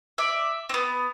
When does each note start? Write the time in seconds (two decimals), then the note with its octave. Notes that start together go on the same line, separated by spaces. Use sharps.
0.18 D5 E5
0.69 B3 C4